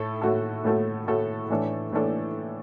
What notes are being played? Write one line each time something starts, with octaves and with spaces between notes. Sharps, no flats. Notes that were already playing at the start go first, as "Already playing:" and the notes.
Already playing: A2 A3 A4
A2 A3 F#4 A4
A2 A3 F#4 A4
A2 A3 F#4 A4
A2 E3 A3 D4 A4
A2 E3 A3 D4 A4